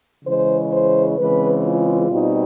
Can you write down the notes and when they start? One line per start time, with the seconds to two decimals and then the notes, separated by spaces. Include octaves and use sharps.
0.24 C#3 E3 G#3 C5
0.71 C5
1.17 C#3 E3 G#3 C4 B4
1.64 F4
2.10 B2 G3 C4 D#4